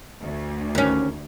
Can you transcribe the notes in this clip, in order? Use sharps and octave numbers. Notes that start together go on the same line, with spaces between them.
D2
D#2 C#4